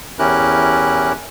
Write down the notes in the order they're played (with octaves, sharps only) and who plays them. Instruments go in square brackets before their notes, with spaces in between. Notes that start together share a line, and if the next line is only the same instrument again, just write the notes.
[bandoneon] E2 C#4 E4 G4 A#4 F#6